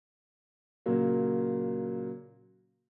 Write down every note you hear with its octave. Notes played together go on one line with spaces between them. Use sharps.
A#2 C#3 F#3 A#3